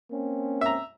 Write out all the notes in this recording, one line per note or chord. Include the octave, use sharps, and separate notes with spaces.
A#3 C4 C#4
E5 A#5